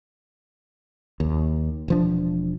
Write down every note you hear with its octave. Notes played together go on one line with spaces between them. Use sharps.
D#2
E1 F3 D4